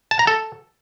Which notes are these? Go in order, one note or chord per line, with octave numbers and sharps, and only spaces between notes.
A5
A#5
A4